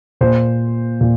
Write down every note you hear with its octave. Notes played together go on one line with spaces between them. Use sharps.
A#2 C5
A#2